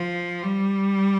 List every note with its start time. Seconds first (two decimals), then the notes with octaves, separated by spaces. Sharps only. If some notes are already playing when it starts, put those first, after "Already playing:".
Already playing: F3
0.43 G3